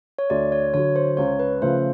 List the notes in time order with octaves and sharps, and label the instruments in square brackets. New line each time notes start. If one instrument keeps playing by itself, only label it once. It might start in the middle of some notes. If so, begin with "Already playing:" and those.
[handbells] C#5
[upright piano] D2 [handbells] D5
[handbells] C#5
[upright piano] D3 F#3 [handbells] C#5
[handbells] C5
[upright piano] C#2 [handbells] C#5
[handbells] B4
[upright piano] C#3 F3 A3 [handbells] C5